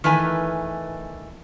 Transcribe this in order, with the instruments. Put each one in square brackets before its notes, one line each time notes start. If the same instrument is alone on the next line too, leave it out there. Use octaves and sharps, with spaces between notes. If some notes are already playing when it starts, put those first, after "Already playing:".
[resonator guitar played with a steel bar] D#3 E3 A3 B4 G#5